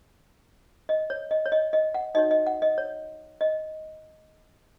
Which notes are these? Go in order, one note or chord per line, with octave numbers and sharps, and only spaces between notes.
D#5
C#5
D#5
C#5
D#5
D#5
F#5
D#4 F#4 C#5 D#5
D#5
F#5
D#5
C#5
D#5